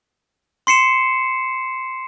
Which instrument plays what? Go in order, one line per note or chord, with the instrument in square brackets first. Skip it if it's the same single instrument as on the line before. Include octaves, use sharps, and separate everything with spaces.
[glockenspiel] C6 C7 C#7 E7